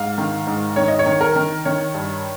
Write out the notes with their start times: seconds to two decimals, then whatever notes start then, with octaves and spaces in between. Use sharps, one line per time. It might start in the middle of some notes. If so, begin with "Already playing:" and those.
Already playing: G#2 F5
0.18 D#3
0.47 G#2
0.76 D#3 C#5
0.88 D#5
0.99 C#5
1.06 D#3
1.21 A#4
1.36 D#3
1.65 D#3 C#5
1.94 G2